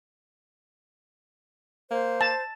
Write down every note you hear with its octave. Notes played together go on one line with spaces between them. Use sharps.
A#3 C5
A5